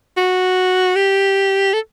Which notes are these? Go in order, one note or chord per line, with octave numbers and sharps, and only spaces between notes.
F#4
G4
A4